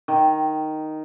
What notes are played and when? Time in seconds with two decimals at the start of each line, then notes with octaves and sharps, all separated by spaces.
0.08 D#3